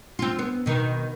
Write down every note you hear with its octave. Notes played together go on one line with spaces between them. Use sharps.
C4 F4
B3
B2 D#3